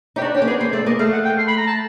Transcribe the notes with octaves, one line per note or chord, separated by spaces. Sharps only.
D#4 G4
D4 F#4
C#4 G4
A#3
B3 G#4
A#3 C5
A3 D5
A#3 D#5
A3 F5
F#5
G5
C6
B5
A#5
A5